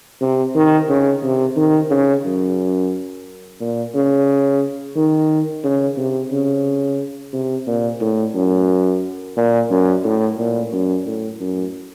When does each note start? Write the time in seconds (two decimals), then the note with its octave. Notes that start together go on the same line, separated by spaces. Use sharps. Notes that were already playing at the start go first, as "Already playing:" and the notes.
0.21 C3
0.55 D#3
0.89 C#3
1.23 C3
1.57 D#3
1.91 C#3
2.25 F#2
3.60 A#2
3.95 C#3
4.96 D#3
5.64 C#3
5.98 C3
6.32 C#3
7.33 C3
7.67 A#2
8.01 A2
8.35 F#2
9.37 A#2
9.70 F#2
10.04 A2
10.38 A#2
10.73 F#2
11.07 A2
11.40 F#2